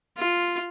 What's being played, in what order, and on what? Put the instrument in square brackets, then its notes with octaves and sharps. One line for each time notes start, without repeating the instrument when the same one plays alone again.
[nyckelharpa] F4